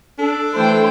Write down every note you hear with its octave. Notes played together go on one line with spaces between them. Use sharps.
D4 A4
E3 A3 C5 G5